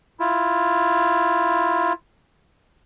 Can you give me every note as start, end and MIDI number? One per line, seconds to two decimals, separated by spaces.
0.20 1.93 64
0.20 1.93 65